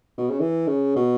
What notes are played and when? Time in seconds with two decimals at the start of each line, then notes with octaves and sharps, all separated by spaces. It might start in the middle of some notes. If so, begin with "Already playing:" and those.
0.18 B2
0.30 C#3
0.40 E3
0.67 C#3
0.96 B2